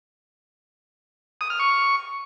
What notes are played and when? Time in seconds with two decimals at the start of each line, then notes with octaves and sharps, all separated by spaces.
1.41 D#6
1.50 F6
1.60 C#6